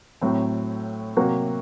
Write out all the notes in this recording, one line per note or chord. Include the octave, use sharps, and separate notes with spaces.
A2 F#3 C4
C3 F#3 A#3 F#4